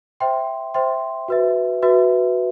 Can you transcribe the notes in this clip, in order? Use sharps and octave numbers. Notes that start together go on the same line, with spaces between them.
C5 E5 G5 C6
C5 E5 G5 C6
F#4 B4 E5
F#4 B4 E5